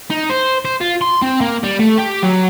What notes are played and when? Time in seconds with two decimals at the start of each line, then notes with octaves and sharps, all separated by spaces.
0.11 D#4
0.30 C5
0.65 C5
0.81 F4
1.01 C6
1.22 C4
1.41 A#3
1.64 G3
1.79 A3
1.98 G4
2.23 F#3